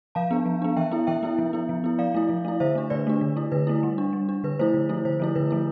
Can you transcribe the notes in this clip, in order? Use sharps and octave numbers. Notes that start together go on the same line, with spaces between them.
F3 F5 A5
B3 D4
F3
B3 D4
E3 E5 G5
B3 E4
E3 E5 G5
B3 E4
F3
B3 E4
F3
B3 E4
F3 D5 F5
A3 E4
F3
A3 E4
D3 C5 E5
A3 D4
D3 B4 D5
A3 D4
D3
A3 E4
D3 B4
A3 E4
G3
D4
G3
D4
D3 B4
F3 A3 E4 C5
D3
F3 A3 E4
D3 C5
F3 A3 E4
D3 B4
F3 A3 E4